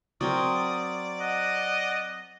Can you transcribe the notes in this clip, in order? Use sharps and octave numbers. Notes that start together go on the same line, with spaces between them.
F#3 C4 A#4 D5 D#6
D#5 F#5